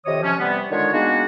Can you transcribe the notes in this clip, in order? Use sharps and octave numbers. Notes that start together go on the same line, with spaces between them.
F2 C3 D#3 C#5 D#5 D#6
C3 F3 C#4
C3 G3 B3
D3 D#3 G#3 D4 F4 C#5
G#3 A#3 B3 D4 D#4 F#4